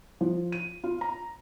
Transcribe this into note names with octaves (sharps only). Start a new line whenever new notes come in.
F3
D#7
F4
A#5